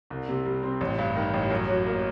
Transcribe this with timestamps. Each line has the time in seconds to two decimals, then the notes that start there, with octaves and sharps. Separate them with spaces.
0.10 C2
0.29 C3
0.45 G3
0.63 C4
0.81 A1
0.99 G2
1.15 D#3
1.34 A1
1.50 F#2
1.68 F#3
1.86 A#3